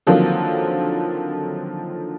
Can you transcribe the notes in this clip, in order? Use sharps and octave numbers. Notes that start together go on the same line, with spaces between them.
D3 D#3 F3 F#3 A#3 C4